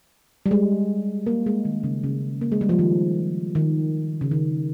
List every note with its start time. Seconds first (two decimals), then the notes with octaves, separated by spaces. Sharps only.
0.46 G3
0.51 G#3
1.27 A#3
1.46 G#3
1.65 D#3
1.83 C#3
2.04 C#3
2.41 A#3
2.52 G#3
2.61 G3
2.69 F3
2.79 D#3
3.55 D#3
4.21 C#3
4.31 D#3